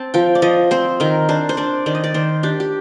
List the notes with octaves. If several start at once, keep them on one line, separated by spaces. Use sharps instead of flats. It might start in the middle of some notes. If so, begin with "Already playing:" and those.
Already playing: C4 A5
F3 G5
D5
F3 D#5
C4 C5
D#3 A#4
D4 C5
C5
D4 D5
D#3 D5
D#5
D5
D#3 C5
D4 G4
G4